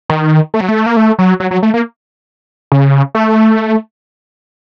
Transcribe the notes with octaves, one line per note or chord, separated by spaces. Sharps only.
D#3
A3
F#3
A3
A#3
A3
F#3
F#3
F#3
A3
A#3
C#3
A3